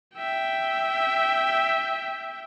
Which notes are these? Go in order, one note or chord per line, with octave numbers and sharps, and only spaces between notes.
E5 G5